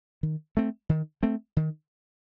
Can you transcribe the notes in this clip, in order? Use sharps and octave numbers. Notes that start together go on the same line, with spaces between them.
D#3
A3 C4
D#3
A3 C4
D#3